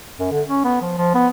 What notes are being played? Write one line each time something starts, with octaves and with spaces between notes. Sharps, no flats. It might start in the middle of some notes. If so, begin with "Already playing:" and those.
F#2
D3
C#4
B3
F3
F3
B3